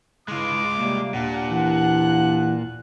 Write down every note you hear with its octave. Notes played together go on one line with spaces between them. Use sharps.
G2 C#3 G#3 E4 F4 D6
C3 G3 A#3
D#2 A#2 D4 F#5
E3 F#6